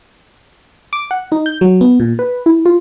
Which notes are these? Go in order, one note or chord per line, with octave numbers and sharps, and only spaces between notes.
D6
F#5
D#4
G6
F#3
B3
A#2
B4
E4
F4